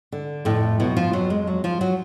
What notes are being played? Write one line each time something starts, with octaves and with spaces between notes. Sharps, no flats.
D3
F2 A2 A3
B2 F#3 B3
F3 F4
F2 F#3
G#3
F#3
F3 F4
F#3 F#4